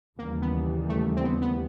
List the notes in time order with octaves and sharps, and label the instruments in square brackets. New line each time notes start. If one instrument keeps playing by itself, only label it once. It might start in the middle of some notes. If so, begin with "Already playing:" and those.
[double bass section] D#2 C#3 E3 G3 [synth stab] A#3
[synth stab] B3
A3
C4
B3
B3